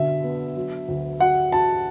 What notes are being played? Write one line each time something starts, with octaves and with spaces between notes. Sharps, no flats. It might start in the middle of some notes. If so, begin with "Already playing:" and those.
Already playing: B2 D3 E5
B3
F#3
D2
F#4 F#5
F#4 A5